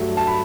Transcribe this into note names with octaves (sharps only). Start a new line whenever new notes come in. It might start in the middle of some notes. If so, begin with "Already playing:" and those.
Already playing: G2 F#3 A3
A5
B5